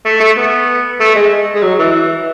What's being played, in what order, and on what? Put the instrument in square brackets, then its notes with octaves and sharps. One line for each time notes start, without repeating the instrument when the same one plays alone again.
[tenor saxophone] A3
A3
B3
A3
G#3
G#3
F#3
E3